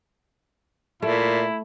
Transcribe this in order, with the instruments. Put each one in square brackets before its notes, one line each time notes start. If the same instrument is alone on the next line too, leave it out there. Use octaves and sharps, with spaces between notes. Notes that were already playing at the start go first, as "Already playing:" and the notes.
[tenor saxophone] A#2 [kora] A3 [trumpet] E4